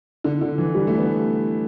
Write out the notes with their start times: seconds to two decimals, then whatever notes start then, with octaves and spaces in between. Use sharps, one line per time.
0.24 D3
0.41 D3
0.58 E3
0.75 G3
0.87 A3
0.99 B3